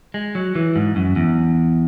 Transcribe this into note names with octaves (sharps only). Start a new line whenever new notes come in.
G#3
F#3
E3
G#2
F#2
E2